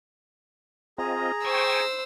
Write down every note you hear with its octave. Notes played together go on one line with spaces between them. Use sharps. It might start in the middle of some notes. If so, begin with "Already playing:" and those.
C4 F4 G#4 D#5 A#5
C5 G5 G#5 C#6 E6